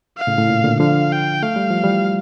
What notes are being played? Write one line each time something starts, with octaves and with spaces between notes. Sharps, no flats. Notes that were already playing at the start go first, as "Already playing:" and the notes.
F5
A2 C#3
A2
A#2
A#2 D3
D3 F3 F5
G5
A3 F5
G3
F3
E3 G3